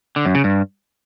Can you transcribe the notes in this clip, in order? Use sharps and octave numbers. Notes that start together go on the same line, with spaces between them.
D3
F#2
C#3
G2